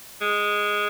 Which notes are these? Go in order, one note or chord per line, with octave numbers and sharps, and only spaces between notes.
G#3